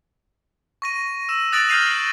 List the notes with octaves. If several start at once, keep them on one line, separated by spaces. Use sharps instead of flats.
C#6 A#6 D#7
E6 E7
D#6 F#6 A6 A#6 D7 F#7
F6 G6 A#6 C7 D#7 F7